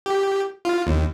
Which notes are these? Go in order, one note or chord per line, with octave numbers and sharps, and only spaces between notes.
G4
F4
D#2